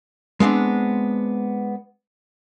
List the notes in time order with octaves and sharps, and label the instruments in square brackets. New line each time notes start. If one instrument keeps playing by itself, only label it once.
[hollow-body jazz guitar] G#3 B3 C4 D4